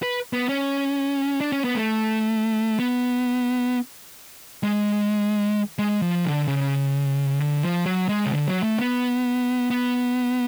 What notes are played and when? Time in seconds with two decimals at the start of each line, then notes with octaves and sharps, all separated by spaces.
0.03 B4
0.33 B3
0.49 C#4
1.41 D4
1.52 C#4
1.64 B3
1.75 A3
2.79 B3
4.63 G#3
5.79 G#3
6.02 F3
6.25 D3
6.48 C#3
7.40 D3
7.63 F3
7.86 F#3
8.09 G#3
8.26 C#3
8.32 D3
8.48 F#3
8.63 A3
8.78 B3
9.70 B3